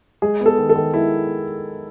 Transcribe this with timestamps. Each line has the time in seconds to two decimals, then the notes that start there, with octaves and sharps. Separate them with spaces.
0.22 G#3 G#4
0.40 B3
0.46 A4
0.58 D#3
0.69 A4
0.75 D#3
0.94 G#3 E4